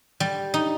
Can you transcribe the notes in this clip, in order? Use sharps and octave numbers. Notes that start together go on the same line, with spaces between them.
G3
D#4